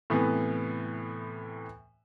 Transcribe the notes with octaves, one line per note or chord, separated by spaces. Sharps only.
A2 C3 E3 B3